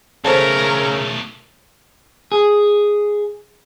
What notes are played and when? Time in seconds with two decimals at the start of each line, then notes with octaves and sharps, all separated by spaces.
0.25 B1 C#3 A3 A4 A#4 C5 C#5 A5
2.32 G#4